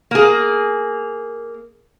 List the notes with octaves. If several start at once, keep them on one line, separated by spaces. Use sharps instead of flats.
A#3 G#4